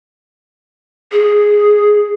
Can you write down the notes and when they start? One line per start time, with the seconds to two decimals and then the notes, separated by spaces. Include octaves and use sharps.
1.12 G#4